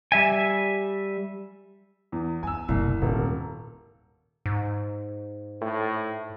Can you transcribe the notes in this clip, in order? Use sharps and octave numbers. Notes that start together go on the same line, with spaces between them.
G3 E5 G#5
E2
F#2 G#5 E6
F#1 C2 B2
D#1 G#2 C3 A#3
G#2
A2